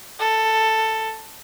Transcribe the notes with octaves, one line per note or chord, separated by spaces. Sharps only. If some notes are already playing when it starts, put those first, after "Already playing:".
A4